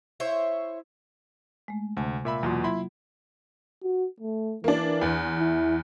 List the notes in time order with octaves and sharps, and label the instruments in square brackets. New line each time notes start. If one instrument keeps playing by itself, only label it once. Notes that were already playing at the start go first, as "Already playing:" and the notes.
[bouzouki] E4 C5 C#5 E5
[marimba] G#3 A3
[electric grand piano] D2 [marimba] C3 G#5 A5
[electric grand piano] A#2 E5 B5
[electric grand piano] E2 B2 C6 [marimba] F#3 A#3 F4
[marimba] F#3 [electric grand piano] E4 B5 C6
[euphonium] F#4
A3
[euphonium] E3 [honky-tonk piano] A#3 D4
[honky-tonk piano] E2
[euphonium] E4